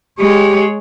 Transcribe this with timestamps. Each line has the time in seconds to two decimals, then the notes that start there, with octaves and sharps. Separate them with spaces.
0.19 G#3 G4 C#5